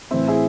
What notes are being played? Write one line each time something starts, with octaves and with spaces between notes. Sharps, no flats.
A2 E3 C4 E4
E4 G#4